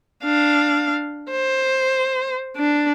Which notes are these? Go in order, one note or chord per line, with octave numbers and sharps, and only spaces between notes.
D4 F5
C5
D4